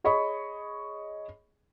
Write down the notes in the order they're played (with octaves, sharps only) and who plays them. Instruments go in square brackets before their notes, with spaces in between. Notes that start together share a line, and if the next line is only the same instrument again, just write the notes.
[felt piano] G#4 C#5 D#5 B5 C#6